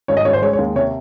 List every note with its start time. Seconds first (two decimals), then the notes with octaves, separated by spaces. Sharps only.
0.08 G#1 C#5
0.17 D#5
0.25 G#1 C#5
0.33 C5
0.42 G#3 C#5
0.53 C#5
0.58 D#2
0.76 C3 C#5